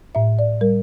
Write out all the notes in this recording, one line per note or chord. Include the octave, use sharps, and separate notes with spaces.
A2 E5
D5
G3 A#4